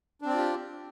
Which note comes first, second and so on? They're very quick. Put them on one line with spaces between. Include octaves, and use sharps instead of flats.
D4 C4 D5 F4 G4